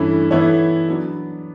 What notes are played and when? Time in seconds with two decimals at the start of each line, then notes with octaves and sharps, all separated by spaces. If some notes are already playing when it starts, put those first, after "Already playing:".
Already playing: G2 E3 A3 C#4 E4
0.31 E3 B3 E4 A4 C#5
0.89 F#3 B3 D4